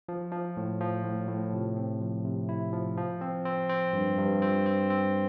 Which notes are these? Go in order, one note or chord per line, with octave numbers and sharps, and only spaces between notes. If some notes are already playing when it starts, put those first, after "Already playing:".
F3
F3
A2
F3
A2
A2
C3
C4
F3
C3
E4
F3
F3
C4
C4
C4
G2
G2
C4
C4
C4